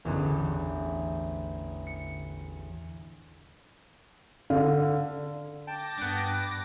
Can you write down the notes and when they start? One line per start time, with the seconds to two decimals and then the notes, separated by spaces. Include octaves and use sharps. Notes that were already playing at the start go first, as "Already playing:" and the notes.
0.05 A1 E2 D3
1.87 C#7
4.50 D3 F5
5.67 G5 A5 D6 A#6
5.97 G2 B3 D4